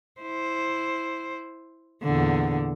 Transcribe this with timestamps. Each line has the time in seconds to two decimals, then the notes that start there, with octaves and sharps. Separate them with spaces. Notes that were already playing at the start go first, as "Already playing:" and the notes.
0.21 E4 C5
2.03 E2 A#2 D3